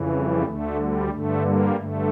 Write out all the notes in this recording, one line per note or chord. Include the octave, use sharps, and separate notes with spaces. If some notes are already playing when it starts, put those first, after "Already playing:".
Already playing: F2 C#3 E3
G3
D2 D3 A3
G3
G2 D3 A3
G3 A#3
G2 D3 A3